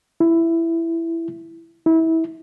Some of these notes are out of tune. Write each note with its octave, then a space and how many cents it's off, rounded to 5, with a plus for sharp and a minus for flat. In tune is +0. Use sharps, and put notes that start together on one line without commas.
E4 +10
E4 -25